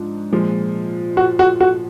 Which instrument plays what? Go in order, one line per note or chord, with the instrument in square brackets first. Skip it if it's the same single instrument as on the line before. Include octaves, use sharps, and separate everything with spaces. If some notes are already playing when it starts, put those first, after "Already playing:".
Already playing: [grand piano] G#2 F3 D4
A#2 F3 G#3
[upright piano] F#4
F#4
F#4